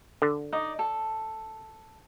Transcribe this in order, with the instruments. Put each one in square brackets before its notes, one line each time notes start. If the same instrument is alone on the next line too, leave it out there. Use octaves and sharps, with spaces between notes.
[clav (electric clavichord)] D3
[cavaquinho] D#4 D5 D#6
A4